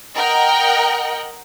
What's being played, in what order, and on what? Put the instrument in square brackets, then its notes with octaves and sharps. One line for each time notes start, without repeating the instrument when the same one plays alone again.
[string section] A#4 D#5 F#5 G5